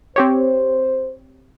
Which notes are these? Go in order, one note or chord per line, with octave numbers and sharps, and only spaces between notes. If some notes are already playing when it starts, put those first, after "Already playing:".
C4 G4 C5 C#5